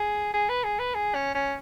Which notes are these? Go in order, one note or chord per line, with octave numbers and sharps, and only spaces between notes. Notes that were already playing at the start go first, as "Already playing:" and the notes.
Already playing: G#4
G#4
B4
G#4
B4
G#4
C#4
C#4